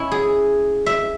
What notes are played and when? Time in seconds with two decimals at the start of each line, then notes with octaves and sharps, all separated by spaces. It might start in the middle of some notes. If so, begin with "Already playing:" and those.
Already playing: C#4 E4
0.12 G#4
0.86 E5